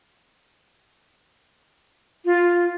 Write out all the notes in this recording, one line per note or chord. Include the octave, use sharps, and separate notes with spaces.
F4